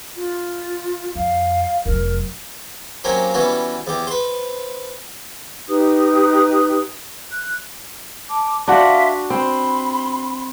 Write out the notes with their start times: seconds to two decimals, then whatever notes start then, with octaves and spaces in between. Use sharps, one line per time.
0.16 F4
1.16 F2 F5
1.85 F1 F#3 A#4
3.04 F#3 A#3 C4 C#4 G4
3.34 E3 G3 B3 C#4 F#4
3.87 E2 G4
4.07 B4 C5
5.68 D#4 G4 B4 D#6
7.30 F#6
8.30 A5 D6
8.68 D4 F#4 E5 F5 C6
9.30 C4 B5 C6